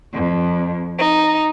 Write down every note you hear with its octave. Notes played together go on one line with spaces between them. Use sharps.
F2
D#4